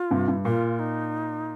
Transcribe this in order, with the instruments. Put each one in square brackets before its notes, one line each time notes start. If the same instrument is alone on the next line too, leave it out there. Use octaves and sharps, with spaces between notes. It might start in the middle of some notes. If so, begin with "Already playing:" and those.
Already playing: [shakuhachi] F4
[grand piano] G2 C3
G2
[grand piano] A#2 [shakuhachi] F4
[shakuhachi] D#4